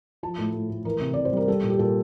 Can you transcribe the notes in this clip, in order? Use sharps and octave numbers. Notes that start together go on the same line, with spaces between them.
F3 A5
A2
A2
A3
E3 A#4
C3
C3 D5
C5
G3 A#4
G3 A4
A#2
G4
A#2 A4